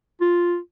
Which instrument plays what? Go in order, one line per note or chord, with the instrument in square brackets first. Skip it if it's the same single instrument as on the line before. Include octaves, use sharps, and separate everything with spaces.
[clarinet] F4